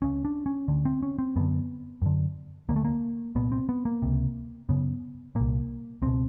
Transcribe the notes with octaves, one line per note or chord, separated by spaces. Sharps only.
C#2 C#3 C#4
D4
C#4
D2 D3
C4
C#4
C4
F#2 D3 B3
F#2 D3
D2 D3 A#3
A3
A#3
C2 A#2 B3
C4
B3
A#3
C#2 C3
F#2 C#3 B3
C2 A#2 A#3
C#2 B2 C4